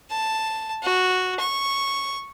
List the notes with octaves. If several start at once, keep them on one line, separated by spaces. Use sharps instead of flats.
A5
F#4
C#6